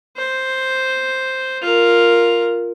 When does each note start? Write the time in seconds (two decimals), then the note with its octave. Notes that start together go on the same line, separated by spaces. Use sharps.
0.17 C5
1.62 F4 A#4